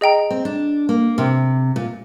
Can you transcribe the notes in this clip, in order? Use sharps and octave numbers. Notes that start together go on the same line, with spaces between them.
G#4 D#5 G5 A#5
C4
D4
A#3
C3 C5 G5 C6 F6
A#2